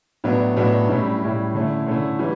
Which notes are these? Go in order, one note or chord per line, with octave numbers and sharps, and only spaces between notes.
A2 F#3 B3 D4
A2 F#3 B3 D4
A2 G3 C#4 E4
A2 G3 C#4 E4
D3 A3 C#4 E4
D3 A3 C#4 E4
E3 G3